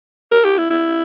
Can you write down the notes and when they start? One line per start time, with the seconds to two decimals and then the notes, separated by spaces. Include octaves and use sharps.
0.32 A#4
0.45 G4
0.58 E4
0.70 E4